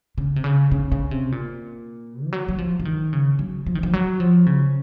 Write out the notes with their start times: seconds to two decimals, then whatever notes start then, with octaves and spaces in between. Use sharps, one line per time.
0.18 C#3
0.36 C3
0.44 C#3
0.72 C#3
0.92 C#3
1.11 C3
1.32 A#2
2.26 F3
2.33 F#3
2.48 F#3
2.58 F3
2.80 F3
2.85 D#3
3.13 C#3
3.39 F#3
3.66 F3
3.75 D#3
3.83 F3
3.93 F#3
4.20 F3
4.46 C#3